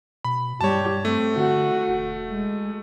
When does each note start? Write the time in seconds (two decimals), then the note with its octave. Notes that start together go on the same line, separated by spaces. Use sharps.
0.24 B2 B5
0.61 G2 G3 G4 C#5 A5
1.05 A3 C4
1.37 D3 F#4
1.88 E1
2.30 G#3